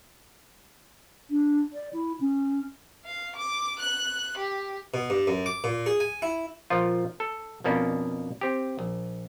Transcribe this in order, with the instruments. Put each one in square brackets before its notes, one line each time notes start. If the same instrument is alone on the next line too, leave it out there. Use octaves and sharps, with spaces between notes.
[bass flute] D4
D5
E4
C#4
[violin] F5
D6
F#6
G4
[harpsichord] B2
G2
F#2
D6
A#2
G#4
G#5
E4
[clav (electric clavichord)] A#2 F3 F4
A4
F2 B2 A#3 C#4 D4
C4 G4
A#1